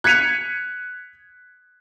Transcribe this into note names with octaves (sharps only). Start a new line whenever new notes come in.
F#6 G#6 B6 C#7 D#7 F7